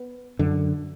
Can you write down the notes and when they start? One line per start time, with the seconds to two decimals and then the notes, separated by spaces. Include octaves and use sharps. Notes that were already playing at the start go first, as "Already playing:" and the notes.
Already playing: B3
0.39 F#2 D3